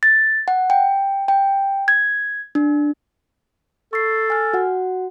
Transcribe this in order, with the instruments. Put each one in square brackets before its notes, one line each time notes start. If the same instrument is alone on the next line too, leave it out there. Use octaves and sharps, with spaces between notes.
[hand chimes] A6
F#5
G5
G5
G#6
D4
[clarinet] A4 [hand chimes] C#6 C7
[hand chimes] G#5 F6
F#4 F#5